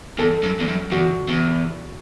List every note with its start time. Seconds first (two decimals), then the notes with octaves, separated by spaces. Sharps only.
0.18 E2 A4
0.43 F#2
0.59 E2
0.67 F#2
0.92 E2 F#4
1.29 E2